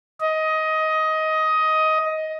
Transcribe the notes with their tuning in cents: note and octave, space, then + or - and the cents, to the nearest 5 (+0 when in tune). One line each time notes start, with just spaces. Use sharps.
D#5 +15